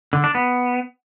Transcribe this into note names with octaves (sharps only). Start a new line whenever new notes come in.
D3
D4
B3